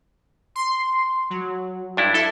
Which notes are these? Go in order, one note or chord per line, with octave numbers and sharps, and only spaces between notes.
C6
F#3
G2 D4 E4
E4 A4